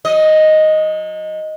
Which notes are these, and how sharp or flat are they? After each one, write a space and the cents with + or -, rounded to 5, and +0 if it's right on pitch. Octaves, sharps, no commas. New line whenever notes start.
F#3 -35 D#5 +0